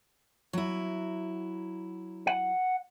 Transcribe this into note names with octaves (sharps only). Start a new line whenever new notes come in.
F#3 E4
F#5